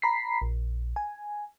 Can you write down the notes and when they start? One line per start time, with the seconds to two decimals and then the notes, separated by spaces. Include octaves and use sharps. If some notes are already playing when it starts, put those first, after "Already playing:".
0.02 A#5 B5 B6 C7
0.42 A#1
0.96 G#5